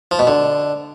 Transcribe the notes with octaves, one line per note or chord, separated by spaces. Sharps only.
F3
B2
D3